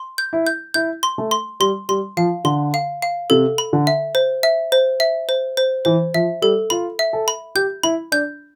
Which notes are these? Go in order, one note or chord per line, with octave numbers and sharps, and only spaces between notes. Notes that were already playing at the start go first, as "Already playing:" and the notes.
Already playing: C6
G6
E4
G6
E4 G6
C6
A3
C6
G3 C6
G3 C6
F3 F5
D3 C6
F5
F5
C3 A4
B5
D3
E5
C5
E5
C5
E5
C5
C5
E3 C5
F3 E5
G3 A4
F4 B5
E5
A4
B5
G4 G6
E4 B5
D4 G6